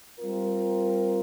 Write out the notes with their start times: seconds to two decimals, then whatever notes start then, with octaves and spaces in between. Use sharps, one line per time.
0.19 G3 C4 F4 A#4